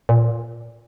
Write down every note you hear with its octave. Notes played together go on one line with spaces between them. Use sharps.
A#2